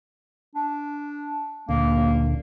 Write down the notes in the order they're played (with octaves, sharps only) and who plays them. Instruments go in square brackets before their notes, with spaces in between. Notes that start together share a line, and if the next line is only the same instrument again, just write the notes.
[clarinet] D4
[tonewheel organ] D2 A#2 D3 [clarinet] A#3